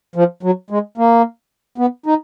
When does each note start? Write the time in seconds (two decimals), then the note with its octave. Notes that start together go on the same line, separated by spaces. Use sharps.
0.16 F3
0.43 F#3
0.70 G#3
0.98 A#3
1.78 B3
2.06 D#4